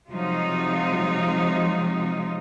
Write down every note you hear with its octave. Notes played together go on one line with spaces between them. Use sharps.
C3 F3 F#3 G#3 D#4 F4